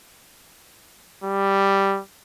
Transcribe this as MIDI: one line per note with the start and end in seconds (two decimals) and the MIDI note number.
1.24 2.00 55